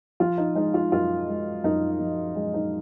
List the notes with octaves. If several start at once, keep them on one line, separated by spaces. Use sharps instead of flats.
F3 F4
D#4
G#3 D#4
F4
F#2 F4
G#3
F#2 D#4
F3
G#3
D#4